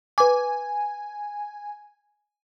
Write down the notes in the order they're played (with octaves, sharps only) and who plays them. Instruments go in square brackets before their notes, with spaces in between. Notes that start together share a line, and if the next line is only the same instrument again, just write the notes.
[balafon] B4 D6 [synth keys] G#5